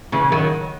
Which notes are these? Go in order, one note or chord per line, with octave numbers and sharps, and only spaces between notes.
C#3 E3
D#3 F#3